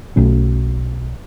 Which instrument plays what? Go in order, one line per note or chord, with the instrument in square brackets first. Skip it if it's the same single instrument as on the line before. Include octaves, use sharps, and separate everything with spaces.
[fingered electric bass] B1 B2 A3 C#4